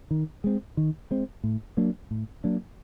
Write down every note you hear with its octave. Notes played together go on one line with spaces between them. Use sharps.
D#3
G#3 C4
D#3
G#3 C4
A2
F#3 A#3 D4
A2
F#3 A#3 D4